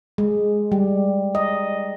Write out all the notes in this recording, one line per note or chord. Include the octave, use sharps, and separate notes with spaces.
G#3
G3
D#5